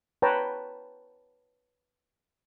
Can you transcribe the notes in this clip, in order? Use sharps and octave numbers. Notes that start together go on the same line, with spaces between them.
B4 C#5 G5 A5 A#5